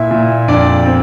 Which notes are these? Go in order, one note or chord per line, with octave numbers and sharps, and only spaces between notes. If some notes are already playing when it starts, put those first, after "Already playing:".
Already playing: A#2 E4 E5
A#2
F2 D4 D5
C4